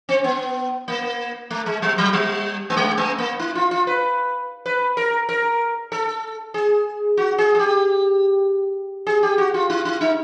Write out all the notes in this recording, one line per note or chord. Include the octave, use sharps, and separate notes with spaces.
C4
B3
A#3
A3
G#3
G3
F#3
G3
A3
G#3
A3
A#3
E4
F4
F4
B4
B4
A#4
A#4
A4
G#4
F#4
G#4
G#4
G4
G#4
G4
F#4
F4
E4
E4
D#4